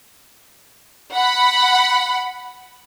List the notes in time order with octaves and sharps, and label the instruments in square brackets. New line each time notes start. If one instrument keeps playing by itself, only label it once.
[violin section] F#5 B5